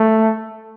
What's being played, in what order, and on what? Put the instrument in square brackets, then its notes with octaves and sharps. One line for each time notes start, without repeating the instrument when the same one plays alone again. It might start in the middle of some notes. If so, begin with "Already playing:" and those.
Already playing: [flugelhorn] A3